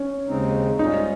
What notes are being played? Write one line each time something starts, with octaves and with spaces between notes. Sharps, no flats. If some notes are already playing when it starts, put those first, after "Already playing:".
Already playing: C#4
D#2 C#3 G#3 C4 D#4
G#2 G3 C#4 D#4 F4